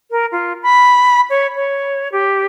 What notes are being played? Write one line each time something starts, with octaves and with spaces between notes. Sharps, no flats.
A#4
F4
B5
C#5
C#5
G4